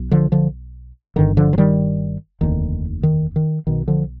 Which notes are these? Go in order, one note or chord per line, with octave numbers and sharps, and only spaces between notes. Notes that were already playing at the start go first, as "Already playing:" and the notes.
Already playing: B1
D3 F3
D3 F3
G1 G2 D3 D#3
D3 F3
F3
D#3 G3
F1 D#2 D3 D#3
D#3
D#3
B1 B2 D#3
D3 F3